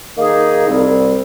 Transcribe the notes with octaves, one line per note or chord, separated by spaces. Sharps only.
D#3 A#3 D#4 G#4
C2 C3 G3 C4